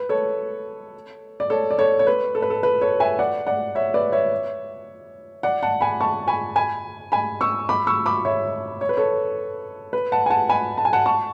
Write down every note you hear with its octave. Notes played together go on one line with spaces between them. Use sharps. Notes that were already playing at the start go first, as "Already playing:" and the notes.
Already playing: B4
A4 C#5
D5
A4 C#5
D5
A4 C#5
C#5
B4
A4
B4
A4
B4
A4 C#5
E5 G#5
D5 F#5
D5 F#5
C#5 E5
B4 D5
C#5 E5
D5 F#5
F#5 A5
G#5 B5
A5 C#6
G#5 B5
G#5 B5
G#5 B5
C#6 E6
B5 D6
C#6 E6
B5 D6
C#5 E5
C#5
B4
A4 C#5
B4
F#5 A5
G#5
F#5 A5
G#5 B5
A5
G#5
F#5 A5
A5 C#6